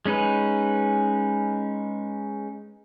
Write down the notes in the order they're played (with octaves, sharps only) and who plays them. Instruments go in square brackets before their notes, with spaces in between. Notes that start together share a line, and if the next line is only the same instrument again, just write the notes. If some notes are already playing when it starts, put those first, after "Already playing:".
[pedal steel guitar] G#3 C#4 D#4 B4